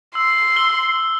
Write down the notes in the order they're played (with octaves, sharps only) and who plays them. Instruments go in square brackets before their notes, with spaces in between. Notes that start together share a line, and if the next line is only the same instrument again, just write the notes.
[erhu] C6 [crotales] E6
[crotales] E6 G7